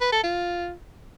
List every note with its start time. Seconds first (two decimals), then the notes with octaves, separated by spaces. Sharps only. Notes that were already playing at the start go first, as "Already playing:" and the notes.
0.01 B4
0.12 A4
0.24 F4